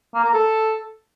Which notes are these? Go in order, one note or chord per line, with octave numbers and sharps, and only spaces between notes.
A#3
A#4
A4